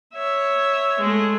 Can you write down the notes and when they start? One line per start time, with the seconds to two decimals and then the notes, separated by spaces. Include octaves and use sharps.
0.14 C#5 E5
1.00 G#3 A3